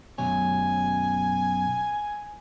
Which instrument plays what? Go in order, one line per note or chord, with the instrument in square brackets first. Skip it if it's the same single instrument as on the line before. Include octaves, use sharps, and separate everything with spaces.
[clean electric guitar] F#2 B2 C#5 [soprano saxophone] G#5